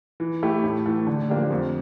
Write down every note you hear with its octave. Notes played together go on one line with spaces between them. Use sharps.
E3
A3 E4 G4
A2
E3 A3
D3
F3 A#3 D4 G4
F2